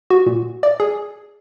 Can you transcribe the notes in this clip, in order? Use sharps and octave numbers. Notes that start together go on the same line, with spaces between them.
F#4
A#2
D5
G#4